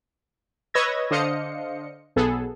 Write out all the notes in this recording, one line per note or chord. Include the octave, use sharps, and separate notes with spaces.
B4 C#5 D#5 E6 G#6 A#6
D3 D4 C5 D#5 F5 C#7
B1 B3 G#4 A4